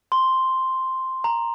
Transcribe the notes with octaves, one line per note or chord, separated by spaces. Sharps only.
C6
A#5